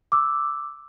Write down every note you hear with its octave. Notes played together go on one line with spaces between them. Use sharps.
D6 E6